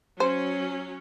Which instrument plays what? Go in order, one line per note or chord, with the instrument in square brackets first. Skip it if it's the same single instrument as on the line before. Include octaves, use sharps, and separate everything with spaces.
[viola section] F#3 C#4 [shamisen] C5